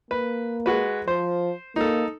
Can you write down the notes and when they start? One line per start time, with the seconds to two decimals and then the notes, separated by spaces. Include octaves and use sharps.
0.11 A#3 B4
0.66 G#3 F#4 B4
1.08 F3 C5
1.76 A#3 D#4 A4